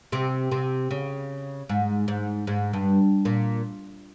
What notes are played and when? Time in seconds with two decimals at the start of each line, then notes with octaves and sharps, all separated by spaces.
0.12 C3 C4
0.51 C3 C4
0.91 C#3
1.69 G#2
2.08 G#2
2.47 G#2
2.73 G2
3.25 A#2